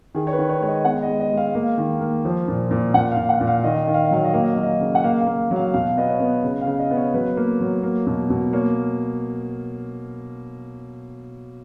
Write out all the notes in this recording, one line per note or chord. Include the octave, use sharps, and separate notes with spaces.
D#3 G#4
C#5
B4
D#3
C#5
G#3 C#5
D#5
B3 F#5
D#5
G#3
D#5
G#3
F5
A#3 F5
D#3
A#3
F3
A#2
A#2
A#2 F#5
F5
A#2
F#5
A#2
F5
D#3 D#5
F5
D#3 D#5
F5
D#5
F#3 F5
D#5
A#3 F5
D#5
F#3 F5
D#5
C#3
F#5
A#3 F5
F5
A#3
F#3
F5
B2 F5
B3 D#5
C#5
B3
C#3
F5
C#3
D#5
B3
C#5
F#3 B4
A#3
F#3
A#3
B2
B2
A#3 C#5